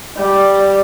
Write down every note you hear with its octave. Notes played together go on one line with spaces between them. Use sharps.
G3